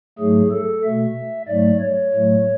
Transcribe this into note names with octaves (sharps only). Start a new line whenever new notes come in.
G#2 F#3 A3 G#4
A4
B2 A3 E5
G#2 F#3 A3 D5
C#5
A2 F#3 A3